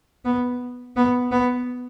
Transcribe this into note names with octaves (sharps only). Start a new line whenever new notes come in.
B3
B3
B3